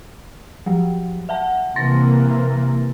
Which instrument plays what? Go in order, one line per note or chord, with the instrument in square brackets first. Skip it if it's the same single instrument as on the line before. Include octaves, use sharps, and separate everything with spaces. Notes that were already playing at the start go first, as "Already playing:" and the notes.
[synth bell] F3 F#3
E5 F#5 A5
[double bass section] C3 E3 A#3 [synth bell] C6 A6 A#6